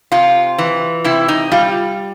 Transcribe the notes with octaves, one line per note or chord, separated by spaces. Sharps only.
C3 F4
E3
C3 E4
D#4
G3 F4